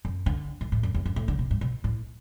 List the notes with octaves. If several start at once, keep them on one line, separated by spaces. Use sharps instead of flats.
F#2
D3
A2
A2
F#2
E2
F#2
A2
D3
B2
G2
B2
A2